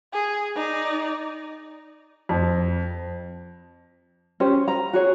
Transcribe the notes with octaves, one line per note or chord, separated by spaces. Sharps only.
G#4
D#4 D5
F2
C#4 G4 C5
A#5
F#4 G#4 C#5